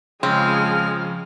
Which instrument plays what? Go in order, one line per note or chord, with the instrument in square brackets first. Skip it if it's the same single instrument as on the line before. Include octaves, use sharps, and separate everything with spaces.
[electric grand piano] C#3 [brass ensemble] F3 [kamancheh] G#3 F6 [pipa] C4